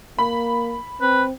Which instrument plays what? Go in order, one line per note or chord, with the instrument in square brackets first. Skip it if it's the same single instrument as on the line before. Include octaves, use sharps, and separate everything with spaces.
[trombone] A#3 [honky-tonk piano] B5
[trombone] C4 [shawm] B4